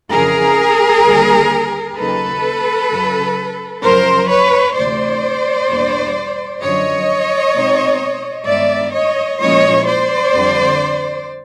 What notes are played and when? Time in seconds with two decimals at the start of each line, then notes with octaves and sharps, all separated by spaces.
0.11 F2 C#3 E3 G#4 A#4
1.04 D#2 D3 G3 A#3
1.96 D#2 C#3 F#3 A#3 D#4 A4 B4
2.90 F#2 C#3 F#3
3.82 F#2 C#3 F3 A#4 C5
4.28 B4 C#5
4.75 D2 C3 E3 A3 C5 D5
5.68 E2 B2 G3 A#3 D4
6.60 F#2 D3 F3 C#5 D#5
7.54 B2 G#3 C4 D#4
8.46 G2 D#3 G#3 B3 D5 E5
8.92 C#5 D#5
9.39 A#2 F3 G#3 C#4 E4 C#5 D#5
9.86 C5 D5
10.32 F2 D3 G3 C4